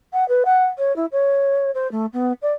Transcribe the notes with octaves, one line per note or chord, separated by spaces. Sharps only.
F#5
B4
F#5
C#5
E4
C#5
C5
A3
B3
D5